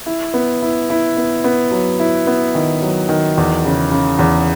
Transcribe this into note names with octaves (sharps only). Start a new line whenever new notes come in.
E4
B3
E4
E4
B3
B3
F#3
E4
B3
D#3
F#3
D#3
E2
C#3
C#3
E2